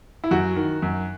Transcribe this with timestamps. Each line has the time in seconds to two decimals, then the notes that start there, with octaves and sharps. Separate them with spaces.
0.24 E4
0.31 F#2 F#4
0.56 D#3
0.82 F#2